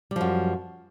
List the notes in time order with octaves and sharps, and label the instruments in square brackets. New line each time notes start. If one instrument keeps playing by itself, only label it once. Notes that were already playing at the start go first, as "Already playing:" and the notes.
[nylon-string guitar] G3
F3
F#2